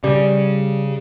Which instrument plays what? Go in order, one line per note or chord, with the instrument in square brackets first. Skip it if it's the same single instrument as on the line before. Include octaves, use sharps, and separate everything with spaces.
[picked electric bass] C#3 [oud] G3